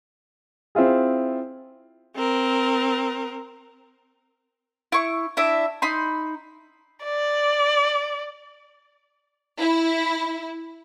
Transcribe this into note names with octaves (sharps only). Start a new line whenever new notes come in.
C4 E4 F4 G#4
C4 A#4
E4 C#6
D4 E4 E5
D#4 B5 C6
D5
E4